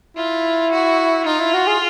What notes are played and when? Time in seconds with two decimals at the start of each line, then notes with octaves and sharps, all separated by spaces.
0.16 E4 F4
0.71 F#4
1.26 D#4 F4
1.40 E4
1.53 F#4
1.67 G#4